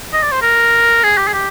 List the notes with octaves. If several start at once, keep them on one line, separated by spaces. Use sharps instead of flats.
D#5
D5
C5
A#4
G#4
G4
G#4
G4